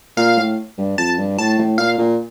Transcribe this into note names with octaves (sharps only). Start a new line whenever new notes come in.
A#2 F5
A2
G2
F2 A5
G2
A2 A5
A2
A#2 F5
A#2